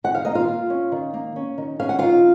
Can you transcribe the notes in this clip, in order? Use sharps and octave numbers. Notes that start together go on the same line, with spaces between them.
D#3 F#5
F5
A#3 D#5
F4 F5
F4
C#4
D#3
A#3
C#4
D#3
C#4 F5
F#5
D#3 F4 F5